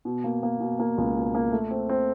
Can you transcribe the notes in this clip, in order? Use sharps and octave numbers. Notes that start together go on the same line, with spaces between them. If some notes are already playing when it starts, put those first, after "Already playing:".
B2
A#3
A#3
B2
A#3
C#2
B2
A#3
A3
C4
C4